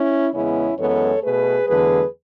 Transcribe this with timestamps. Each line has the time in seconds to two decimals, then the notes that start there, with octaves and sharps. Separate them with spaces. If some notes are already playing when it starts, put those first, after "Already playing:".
Already playing: C#4 E4
0.32 E2 C#3 G#3 B3 C#4 E4
0.77 F#2 E3 G#3 B3 A4 C#5
1.22 B2 A3 G#4 B4
1.66 E2 D3 F#3 A3 G#4 B4